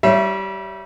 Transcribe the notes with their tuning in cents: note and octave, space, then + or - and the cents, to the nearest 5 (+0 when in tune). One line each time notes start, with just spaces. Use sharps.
G3 -20 C#5 +0 E5 +15